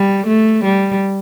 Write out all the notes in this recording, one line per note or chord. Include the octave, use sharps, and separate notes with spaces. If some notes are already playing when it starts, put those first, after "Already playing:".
Already playing: G3
A3
G3